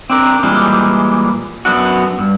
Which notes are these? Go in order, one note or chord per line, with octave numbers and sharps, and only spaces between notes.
C4 D4 A#4
A#2 E3 G3 G#3
F#2 B3 D4 F#4
G2